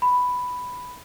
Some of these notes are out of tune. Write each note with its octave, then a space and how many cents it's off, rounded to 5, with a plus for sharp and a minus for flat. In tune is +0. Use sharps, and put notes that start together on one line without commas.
B5 +5